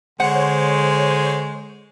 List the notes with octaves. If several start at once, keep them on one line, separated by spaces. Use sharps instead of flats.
D3 G#3 C5 C#5 F#5